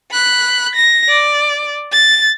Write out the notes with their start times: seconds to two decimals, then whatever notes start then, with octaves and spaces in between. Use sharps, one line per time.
0.11 B5 F#6
0.76 A#6
1.09 D5
1.92 A6